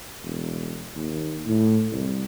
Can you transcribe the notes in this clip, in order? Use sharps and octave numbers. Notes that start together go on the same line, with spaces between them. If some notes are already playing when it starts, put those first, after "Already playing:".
E1
D#2
A2
C2